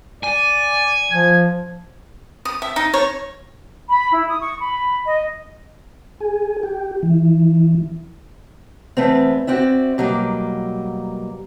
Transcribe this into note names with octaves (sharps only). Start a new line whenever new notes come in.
D5 G#5
F3 G#6
D#6
E5
D#4
C#5
B5
E4
D#6
C#6
B5
D#5
G#4
G4
E3
E2 A3 B3 C4
C4 F#4 D5 E5
B2 F#3 G3 A#3